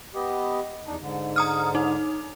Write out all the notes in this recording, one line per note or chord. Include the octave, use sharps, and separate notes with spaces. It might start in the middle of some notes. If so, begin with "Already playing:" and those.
B3 G4 D#5
E2 D4 D#4
G#2 D3
A#5 D#6 F6
D#4